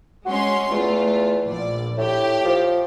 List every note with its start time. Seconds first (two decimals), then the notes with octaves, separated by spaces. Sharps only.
0.26 G#3 C#4 F#4 C6
0.71 E2 A3 F4
1.45 A#1 D5
1.98 A2 G4
2.45 F3